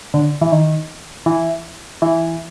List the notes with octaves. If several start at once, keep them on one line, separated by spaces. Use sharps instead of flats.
D3
E3
D#3
E3
E3